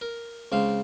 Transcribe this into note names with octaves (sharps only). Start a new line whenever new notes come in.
A#4
C#2 C4 F5